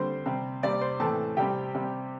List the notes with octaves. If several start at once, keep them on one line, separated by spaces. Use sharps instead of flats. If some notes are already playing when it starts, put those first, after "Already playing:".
Already playing: D3 G3 C4 C5 C6
C3 G3 C4
C3 G3 C4 D5 D6
C5 C6
A2 E3 C4 A4 A5
C3 G3 C4 G4 G5
C3 G3 C4